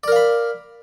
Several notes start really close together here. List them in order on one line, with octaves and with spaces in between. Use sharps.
D5 A#4 F5 B5